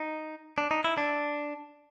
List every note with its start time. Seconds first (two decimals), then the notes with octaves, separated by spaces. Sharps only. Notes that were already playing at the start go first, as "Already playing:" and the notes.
Already playing: D#4
0.58 D4
0.71 D#4
0.84 E4
0.98 D4